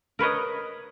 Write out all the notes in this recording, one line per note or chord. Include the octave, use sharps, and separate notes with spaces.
A#4 B4 C#5 D#5